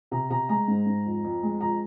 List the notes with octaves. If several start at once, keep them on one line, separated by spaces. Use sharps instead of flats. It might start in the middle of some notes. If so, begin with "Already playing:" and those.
C3 A#5
C3 A#5
G#3 A#5
G#2
G#2
F2
F2
G#3
F2 A#5